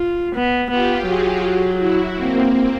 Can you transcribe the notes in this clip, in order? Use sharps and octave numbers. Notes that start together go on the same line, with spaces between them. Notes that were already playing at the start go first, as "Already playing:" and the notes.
Already playing: F4
B3
B3 F4 G4
F#3 F#4 G#4
E4 F#4
A#3 C4